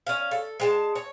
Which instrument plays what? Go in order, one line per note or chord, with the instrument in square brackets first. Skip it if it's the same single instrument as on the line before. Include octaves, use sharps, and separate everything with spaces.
[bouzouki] C#4 F5
A4
G#3 G5 A5
C#5